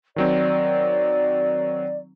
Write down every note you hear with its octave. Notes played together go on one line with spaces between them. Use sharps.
D#3 F#3 C4 D5